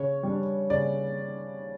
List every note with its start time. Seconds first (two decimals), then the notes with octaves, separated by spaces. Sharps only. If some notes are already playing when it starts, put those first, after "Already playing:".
Already playing: C#3 C#5
0.23 G3 D4
0.70 C#3 D5